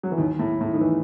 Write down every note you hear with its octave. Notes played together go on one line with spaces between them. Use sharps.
F#3
E3
D#2 D#3
A2
A2
D#3
E3